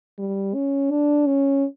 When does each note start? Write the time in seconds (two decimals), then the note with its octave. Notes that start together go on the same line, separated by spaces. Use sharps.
0.18 G3
0.55 C#4
0.91 D4
1.26 C#4